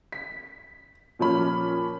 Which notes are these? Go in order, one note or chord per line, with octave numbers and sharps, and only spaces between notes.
B6
A#2 F3 C#4 B5 F6